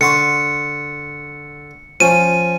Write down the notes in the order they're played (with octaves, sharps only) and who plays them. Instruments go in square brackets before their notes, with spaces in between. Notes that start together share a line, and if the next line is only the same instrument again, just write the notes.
[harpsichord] D3 C6 C#6 [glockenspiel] C#7
[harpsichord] F3 C#4 [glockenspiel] D#7